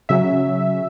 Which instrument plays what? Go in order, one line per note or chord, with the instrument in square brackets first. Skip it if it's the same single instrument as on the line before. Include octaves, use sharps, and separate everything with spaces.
[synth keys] C#3 F#3 C#4 E5